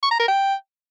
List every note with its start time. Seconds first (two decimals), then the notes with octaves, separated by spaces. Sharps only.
0.03 C#6
0.12 A#5
0.20 A#4
0.28 G5